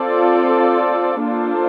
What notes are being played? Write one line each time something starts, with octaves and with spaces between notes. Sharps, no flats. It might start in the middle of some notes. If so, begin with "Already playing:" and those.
Already playing: C4 F4 A4 D5
A#3 D4 F4 A4 C5